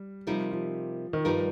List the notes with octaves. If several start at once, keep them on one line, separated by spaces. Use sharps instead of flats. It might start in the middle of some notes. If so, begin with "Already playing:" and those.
Already playing: G3
C3 F3 G3 D#4 A#4
F3
D#3
G2 F3 G3 D#4 A#4